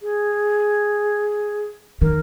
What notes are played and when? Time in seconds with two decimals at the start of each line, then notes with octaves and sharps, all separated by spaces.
0.01 G#4
2.02 D#3 A#4